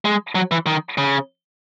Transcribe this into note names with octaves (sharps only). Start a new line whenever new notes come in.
G#3
F#3
E3
D#3
C#3